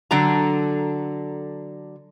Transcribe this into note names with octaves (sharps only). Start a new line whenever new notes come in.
D3 F#3 D4 A4 A#5